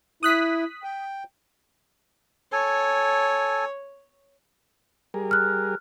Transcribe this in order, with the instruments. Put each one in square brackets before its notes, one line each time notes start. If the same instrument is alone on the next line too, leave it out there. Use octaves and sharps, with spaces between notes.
[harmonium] E4 [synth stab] D#6 F#6 B6
[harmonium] G5
[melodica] A4 G#5 [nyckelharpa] C#5
[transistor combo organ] G3 G#4 A#4
[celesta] F6 F#6